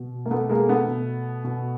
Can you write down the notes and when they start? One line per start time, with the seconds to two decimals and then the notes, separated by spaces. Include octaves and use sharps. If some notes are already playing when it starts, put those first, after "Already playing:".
Already playing: B2
0.26 A#3
0.31 B2 A3 B3
0.49 G#3 A#3
0.68 A3 B3
0.88 B2
1.44 B2